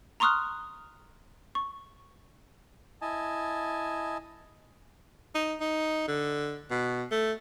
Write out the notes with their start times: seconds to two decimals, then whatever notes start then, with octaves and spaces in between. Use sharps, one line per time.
0.20 A#5 C6 C#6 D#6 F6 F#6
1.55 C#6
3.02 E4 D#5 G#5 A5
5.35 D#4
5.60 D#4
6.08 D3
6.71 B2
7.11 A3